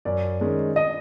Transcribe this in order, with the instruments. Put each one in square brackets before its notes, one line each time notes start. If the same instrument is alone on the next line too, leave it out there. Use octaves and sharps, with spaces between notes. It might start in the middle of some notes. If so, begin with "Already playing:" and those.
[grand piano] F#2 [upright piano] D5
[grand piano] D#3 G#3 C#4
[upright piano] D#5